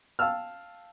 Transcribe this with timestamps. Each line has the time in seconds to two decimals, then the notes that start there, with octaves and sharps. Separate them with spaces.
0.19 F5 G5 A5 E6 F6